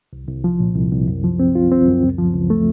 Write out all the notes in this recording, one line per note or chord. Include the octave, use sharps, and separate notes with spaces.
C2
C2
F3
A#2
C2
C2
F#2
F3
C4
F4
C4
F#2
C#2
F3
C#2
A3